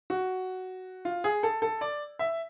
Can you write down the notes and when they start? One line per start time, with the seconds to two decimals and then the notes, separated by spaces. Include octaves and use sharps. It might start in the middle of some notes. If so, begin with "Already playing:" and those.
0.10 F#4
1.05 F4
1.24 G#4
1.43 A4
1.62 A4
1.81 D5
2.19 E5